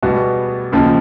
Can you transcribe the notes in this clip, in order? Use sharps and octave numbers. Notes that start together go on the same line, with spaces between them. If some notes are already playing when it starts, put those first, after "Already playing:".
E2 B2 G3 B3 F#4
D#2 C#3 F3